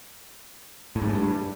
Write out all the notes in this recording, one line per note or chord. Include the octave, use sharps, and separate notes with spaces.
A2
G#2
A2
G2